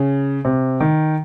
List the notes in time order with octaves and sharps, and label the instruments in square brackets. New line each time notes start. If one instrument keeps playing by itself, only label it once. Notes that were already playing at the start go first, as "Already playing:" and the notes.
Already playing: [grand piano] C#3
C3
D#3